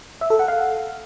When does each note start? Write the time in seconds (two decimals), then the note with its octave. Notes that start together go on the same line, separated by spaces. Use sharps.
0.21 E5
0.30 A4
0.39 F#5
0.48 F5